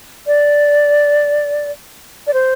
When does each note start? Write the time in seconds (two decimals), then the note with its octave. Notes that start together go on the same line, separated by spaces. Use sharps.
0.27 D5
2.27 D5
2.34 C5